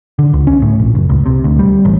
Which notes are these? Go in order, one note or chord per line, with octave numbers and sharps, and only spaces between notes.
D3
C#2
C#4
A2
A#1
F#1
C#2
C3
D2
G3
A1